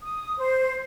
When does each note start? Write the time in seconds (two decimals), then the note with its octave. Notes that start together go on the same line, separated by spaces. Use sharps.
0.03 D#6
0.38 C5